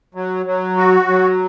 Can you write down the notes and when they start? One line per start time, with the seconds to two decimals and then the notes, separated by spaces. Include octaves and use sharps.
0.15 F#3
0.46 F#3
0.77 F#4
1.08 F#3